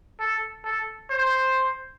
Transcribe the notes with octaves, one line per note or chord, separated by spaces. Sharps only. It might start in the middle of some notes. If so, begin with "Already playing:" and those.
A4
A4
C5